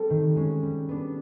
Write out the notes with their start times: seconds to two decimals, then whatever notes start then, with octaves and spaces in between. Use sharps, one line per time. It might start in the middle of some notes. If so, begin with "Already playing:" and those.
Already playing: G3 C4 A4
0.10 D#3
0.36 G#3 C#4
0.63 G3
0.89 B3 D4